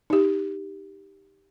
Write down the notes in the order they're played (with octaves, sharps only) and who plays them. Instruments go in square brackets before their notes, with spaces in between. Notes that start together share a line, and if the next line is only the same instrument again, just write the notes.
[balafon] D#4 G4